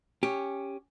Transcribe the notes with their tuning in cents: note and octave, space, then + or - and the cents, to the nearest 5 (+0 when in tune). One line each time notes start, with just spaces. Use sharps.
C#4 +0 G4 +10